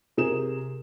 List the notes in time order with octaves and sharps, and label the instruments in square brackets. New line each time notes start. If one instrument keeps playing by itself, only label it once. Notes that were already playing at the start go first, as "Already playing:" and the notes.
[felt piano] C3 G#4 A#4 E7